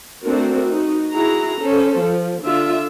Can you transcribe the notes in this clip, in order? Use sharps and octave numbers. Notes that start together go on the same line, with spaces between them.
A3 C4 D4 F#4 A#4
D#4 F#4
E4 F#4 G#4 A#5
C#4 A4 C5
F3
D3 D4 F4 E5